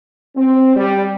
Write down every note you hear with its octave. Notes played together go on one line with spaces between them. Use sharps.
C4
G3